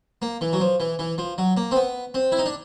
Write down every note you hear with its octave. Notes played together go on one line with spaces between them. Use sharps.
A#3
E3
F#3
F3
E3
E3
F3
F#3
A#3
C4
B3
C4
E4
D#4
D4